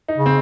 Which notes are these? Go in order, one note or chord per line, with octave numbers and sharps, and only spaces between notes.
D#4
C#3
C4